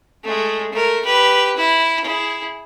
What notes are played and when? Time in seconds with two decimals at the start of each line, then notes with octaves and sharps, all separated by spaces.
0.24 G#3 A3
0.73 A3 A#4
1.05 G4 B4
1.56 E4
2.04 E4 G#4